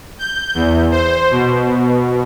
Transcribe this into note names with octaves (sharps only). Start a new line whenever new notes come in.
G6
E2
C5
B2